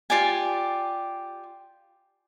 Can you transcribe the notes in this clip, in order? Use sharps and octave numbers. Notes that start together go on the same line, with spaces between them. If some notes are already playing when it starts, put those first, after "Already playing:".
F4 G4 D5 G#5